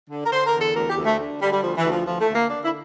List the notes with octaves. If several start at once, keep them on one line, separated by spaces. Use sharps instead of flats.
D3
A#4
D3 C5
A#4
E2
A4
D2 A#4
G4
D2
A3
D3
D3 G3
G3
D2 F3
E3
D2
F3
D2 F3
A3
D2
A#3
D3 D4
E4